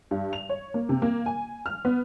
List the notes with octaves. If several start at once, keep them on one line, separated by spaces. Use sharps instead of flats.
G2
F7
C#5
A#3
C3
A#3
G#5
F6
B3